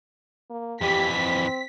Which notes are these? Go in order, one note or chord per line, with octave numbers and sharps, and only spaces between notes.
A#3
F2 E3 G4 B6
C4